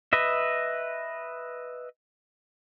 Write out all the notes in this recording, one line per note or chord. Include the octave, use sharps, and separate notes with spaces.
B4 D#5 E5